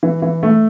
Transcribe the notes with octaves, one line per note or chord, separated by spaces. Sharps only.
E3
E3
A3